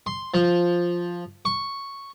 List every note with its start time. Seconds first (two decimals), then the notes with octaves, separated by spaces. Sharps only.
0.06 C6
0.34 F3
1.45 C#6